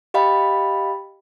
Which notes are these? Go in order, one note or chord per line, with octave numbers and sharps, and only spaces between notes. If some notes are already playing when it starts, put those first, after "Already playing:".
G4 D#5 F5 G5 B5